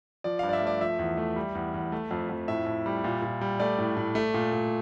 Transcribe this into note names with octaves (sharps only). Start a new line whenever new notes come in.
F3 D5
G2 F5
D5
E5
A3
D5
F3 E5
E2
A3
G3
E2
E2
A3
F2
F2
A2 E5
A2
G3
A#2
A#2
G3
A3 D5
A2
A2
A3
A#2
A#2